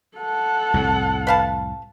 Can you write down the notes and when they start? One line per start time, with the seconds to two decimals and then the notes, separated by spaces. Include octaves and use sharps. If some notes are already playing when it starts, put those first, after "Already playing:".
0.17 A4 F#5
0.74 C2 F2 A2
1.27 B4 F5 A5